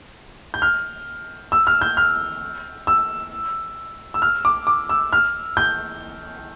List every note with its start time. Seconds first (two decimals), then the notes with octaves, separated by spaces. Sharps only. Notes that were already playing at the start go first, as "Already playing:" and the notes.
0.54 G6
0.62 F6
1.52 E6
1.67 F6
1.81 G6
1.97 F6
2.87 E6
4.14 E6
4.22 F6
4.45 D6
4.67 D6
4.89 E6
5.13 F6
5.57 G6